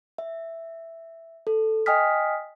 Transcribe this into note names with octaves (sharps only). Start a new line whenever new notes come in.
E5
A4
D#5 G5 G#5 D#6 F6 B6